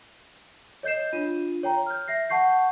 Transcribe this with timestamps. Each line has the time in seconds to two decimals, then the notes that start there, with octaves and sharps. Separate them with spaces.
0.83 C#5 D#5 G6 C7 E7
1.13 D4 F4 D#7
1.63 C#5 G5 A#5
1.86 F6 G6
2.08 E5 A#6 C7
2.29 F#5 A5 C#6 G6 C7